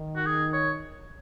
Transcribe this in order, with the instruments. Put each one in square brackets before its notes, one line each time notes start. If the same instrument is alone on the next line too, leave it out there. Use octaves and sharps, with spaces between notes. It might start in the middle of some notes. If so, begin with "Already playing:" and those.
Already playing: [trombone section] D#3
[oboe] F#4
G#4
C#5